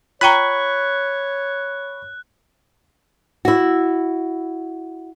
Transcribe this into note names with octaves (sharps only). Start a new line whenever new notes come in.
F4 C#5 G5 A#5 B5 C#6 F#6
E4 F#4